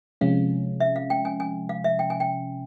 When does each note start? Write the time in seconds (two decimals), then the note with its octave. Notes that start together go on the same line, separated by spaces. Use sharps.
0.21 C3 F3 G#3 C#4 F5
0.80 E5
0.96 F5
1.10 G5
1.25 G#5
1.40 G#5
1.69 F5
1.84 E5
1.99 G5
2.10 G#5
2.20 G5